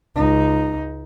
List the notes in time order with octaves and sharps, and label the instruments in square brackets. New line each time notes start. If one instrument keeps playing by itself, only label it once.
[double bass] C#2 D#4